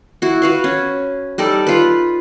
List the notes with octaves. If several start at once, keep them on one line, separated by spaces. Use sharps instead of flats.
E4 F#4
F#4 B4 F5
C#4
G3 D#4 A4 D5
F4 B4